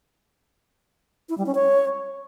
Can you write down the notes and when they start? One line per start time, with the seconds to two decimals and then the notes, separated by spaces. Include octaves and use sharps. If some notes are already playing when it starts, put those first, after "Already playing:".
1.29 E4
1.38 G3
1.46 C#4
1.55 C#5